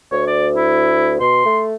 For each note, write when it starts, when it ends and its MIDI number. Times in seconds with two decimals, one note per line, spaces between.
0.12 1.16 38
0.12 0.22 73
0.27 0.47 74
0.56 1.13 64
1.20 1.45 47
1.20 1.61 84
1.45 1.75 57